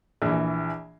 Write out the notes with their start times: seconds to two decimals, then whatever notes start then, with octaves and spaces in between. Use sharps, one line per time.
0.22 A#1 E3